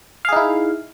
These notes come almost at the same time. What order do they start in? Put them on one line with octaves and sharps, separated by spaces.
F5 G#4 D#4 E4